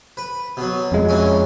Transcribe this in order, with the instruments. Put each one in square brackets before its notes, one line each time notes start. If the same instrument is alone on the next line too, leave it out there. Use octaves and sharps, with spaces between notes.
[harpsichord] B4
B2 F#3
[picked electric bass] F2 G#3
[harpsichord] E3 F#3 C#4